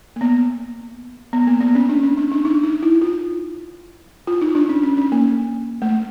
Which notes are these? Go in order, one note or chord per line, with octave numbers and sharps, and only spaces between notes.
A#3
B3
B3
A#3
B3
C#4
D4
C#4
D4
D4
D#4
D#4
E4
F4
F4
D#4
D4
C#4
C#4
C#4
A#3
A3